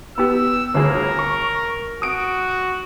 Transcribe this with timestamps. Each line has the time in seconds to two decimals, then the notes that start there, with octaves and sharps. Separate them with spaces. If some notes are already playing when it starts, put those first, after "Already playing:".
0.18 B3 G4 E6
0.74 G1 D2 G#4 A#4
1.19 C#6
2.02 F#4 D#6 D7